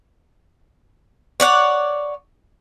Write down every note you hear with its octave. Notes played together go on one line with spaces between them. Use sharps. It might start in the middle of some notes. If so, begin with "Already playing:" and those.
C#5 D5 F#5